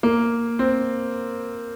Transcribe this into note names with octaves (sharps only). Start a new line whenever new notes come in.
A#3
C4